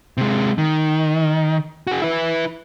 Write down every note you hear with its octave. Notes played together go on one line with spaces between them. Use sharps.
C3 G#3
D#3
F#4 G#4
E4 B4